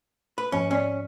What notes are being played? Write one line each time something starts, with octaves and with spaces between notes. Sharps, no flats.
B4
G#2 F3 C#4
C#4 C#5 D5 G#5